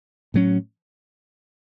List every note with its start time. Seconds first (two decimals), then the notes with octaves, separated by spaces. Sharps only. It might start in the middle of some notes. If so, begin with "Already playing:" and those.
0.34 A2 F#3 C#4